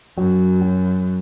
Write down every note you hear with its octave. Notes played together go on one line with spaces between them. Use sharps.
F#2 F#3
F#3